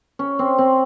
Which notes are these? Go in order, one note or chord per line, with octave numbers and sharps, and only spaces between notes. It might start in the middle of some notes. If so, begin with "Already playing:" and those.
C#4
C4
C4